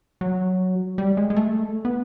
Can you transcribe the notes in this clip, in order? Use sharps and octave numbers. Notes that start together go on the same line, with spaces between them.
F#3
G3
G#3
G#3
A3
B3